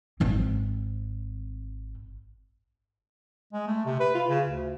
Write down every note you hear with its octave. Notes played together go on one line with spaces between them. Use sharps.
G#1 C4
G#3
A3
C3
B4
F4
C#3
D2